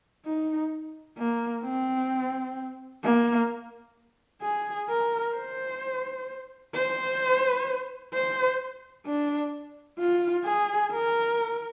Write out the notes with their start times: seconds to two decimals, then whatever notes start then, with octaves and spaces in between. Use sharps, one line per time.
0.26 D#4
1.18 A#3
1.64 C4
3.03 A#3
4.42 G#4
4.89 A#4
5.35 C5
6.75 C5
8.13 C5
9.06 D4
9.99 F4
10.45 G#4
10.91 A#4